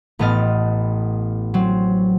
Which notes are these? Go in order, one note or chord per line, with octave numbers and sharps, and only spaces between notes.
A1 A2 B3 D#5 F6 A6
F#3 C4